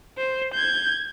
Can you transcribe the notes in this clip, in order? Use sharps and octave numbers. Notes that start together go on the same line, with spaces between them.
C5
G6 G#6